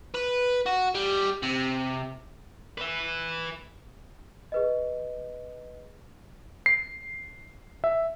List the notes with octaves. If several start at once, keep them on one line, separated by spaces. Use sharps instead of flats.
B4
F#4
G3
C3
B4 E5
G#4 B4 D#5
C7
E5